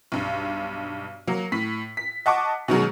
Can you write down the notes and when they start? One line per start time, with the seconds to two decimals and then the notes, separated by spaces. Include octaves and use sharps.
0.12 B1 G2
1.27 F#3 A#3
1.52 A2 B6
1.97 B6
2.26 D#5 F#5 A5 C#6 D6
2.68 B2 D#3 F#3 G#3